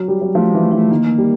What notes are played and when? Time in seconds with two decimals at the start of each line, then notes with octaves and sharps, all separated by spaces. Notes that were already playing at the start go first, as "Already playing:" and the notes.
Already playing: F#3
0.08 G3
0.21 F#3
0.35 F3 A3
0.50 E3 G#3
0.63 A3
0.72 F3
0.77 A3
0.91 D#3 A#3
1.18 G3